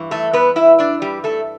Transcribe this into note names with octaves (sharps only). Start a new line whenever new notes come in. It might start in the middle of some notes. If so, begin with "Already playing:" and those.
Already playing: G2 E3
A3 A4
B3 B4
E4 E5
D4 D5
G3 G4
A3 A4